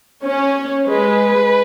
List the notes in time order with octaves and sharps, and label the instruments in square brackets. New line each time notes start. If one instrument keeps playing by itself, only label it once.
[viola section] C#4 [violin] C#5
[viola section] G#3 [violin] B4